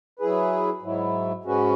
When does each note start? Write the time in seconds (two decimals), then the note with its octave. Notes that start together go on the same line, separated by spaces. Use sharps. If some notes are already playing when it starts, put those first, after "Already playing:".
0.19 F#3 E4 G#4 B4
0.82 G#2 F#3 E4
1.44 G#2 G#3 C#4 F#4 B4